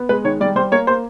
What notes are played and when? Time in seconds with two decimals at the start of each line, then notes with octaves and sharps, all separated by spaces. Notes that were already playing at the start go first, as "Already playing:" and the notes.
Already playing: B3
0.09 G#3 B4
0.24 D#3 C#5
0.40 G3 D5
0.56 G3 C5
0.72 A#3 C#5
0.87 A#3 C5